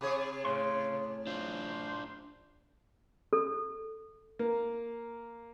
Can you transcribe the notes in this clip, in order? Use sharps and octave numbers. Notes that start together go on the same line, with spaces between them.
C3 G#4 C#5
A2 C#3 C6
D4 F4 C5
A4
A#3